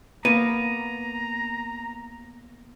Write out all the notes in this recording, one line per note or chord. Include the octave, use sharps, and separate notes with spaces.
A#3 B3 A#5 D#7